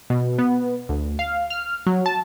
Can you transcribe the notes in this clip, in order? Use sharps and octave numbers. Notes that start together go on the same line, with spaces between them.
B2
B3
D2
F5
F6
F#3
A5